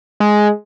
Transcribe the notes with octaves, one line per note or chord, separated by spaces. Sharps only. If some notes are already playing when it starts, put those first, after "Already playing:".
G#3